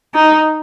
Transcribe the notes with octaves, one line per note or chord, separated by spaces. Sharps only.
D#4